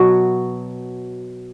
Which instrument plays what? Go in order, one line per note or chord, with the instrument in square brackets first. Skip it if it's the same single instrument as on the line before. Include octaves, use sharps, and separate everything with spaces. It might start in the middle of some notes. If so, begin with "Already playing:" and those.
Already playing: [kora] B2 F#3 F#4